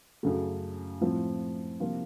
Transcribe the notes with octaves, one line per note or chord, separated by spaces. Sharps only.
F#2 C#3 A3
A2 F3 C4
C3 F3 A#3 F4